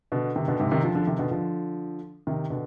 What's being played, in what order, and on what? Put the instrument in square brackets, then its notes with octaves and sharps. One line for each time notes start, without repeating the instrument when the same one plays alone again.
[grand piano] B2 D3
C3 D#3
B2 D3
G#2 C3
C3 D#3
D3 F3
D3 F3
C3 D#3
B2 D3
D3 F3
C3 D#3
B2 D3